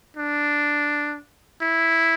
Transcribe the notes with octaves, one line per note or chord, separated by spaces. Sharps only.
D4
E4